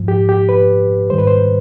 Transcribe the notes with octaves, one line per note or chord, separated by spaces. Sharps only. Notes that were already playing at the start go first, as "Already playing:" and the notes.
Already playing: G#2 F3
G4
G4
B4
G#2 D#3 G3 C5
B4
C5